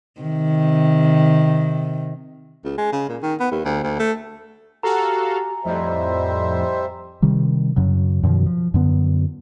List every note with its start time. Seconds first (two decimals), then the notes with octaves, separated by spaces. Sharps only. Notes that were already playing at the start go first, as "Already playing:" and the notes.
0.21 C3 D#3
2.65 C#2
2.78 G#3
2.92 C#3
3.09 A#2
3.22 D#3
3.40 B3
3.51 D#2
3.65 D2
3.84 D2
3.99 A3
4.83 F#4 G4 A4 F5 G#5 A#5
5.65 F2 A2 G3 C5 D#5 E5
7.22 C3 D#3 G3
7.76 F#2 C#3 F#3
8.23 F#2 B2 D#3 F3
8.46 F3
8.74 F#2 D3 B3